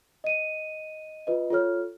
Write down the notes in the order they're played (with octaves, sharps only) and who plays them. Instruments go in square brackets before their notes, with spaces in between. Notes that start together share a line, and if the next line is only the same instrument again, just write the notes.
[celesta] D#5 D#7
F4 B4 D#5
F4 A4 C#5 F6